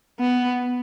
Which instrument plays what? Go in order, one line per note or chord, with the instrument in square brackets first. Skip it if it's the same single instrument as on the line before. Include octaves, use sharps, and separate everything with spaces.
[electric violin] B3